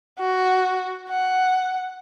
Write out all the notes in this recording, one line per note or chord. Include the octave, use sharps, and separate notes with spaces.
F#4
F#5